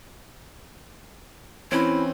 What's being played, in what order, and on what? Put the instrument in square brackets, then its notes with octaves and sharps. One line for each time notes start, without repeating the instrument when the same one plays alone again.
[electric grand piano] E3 C4 C#4 [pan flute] E4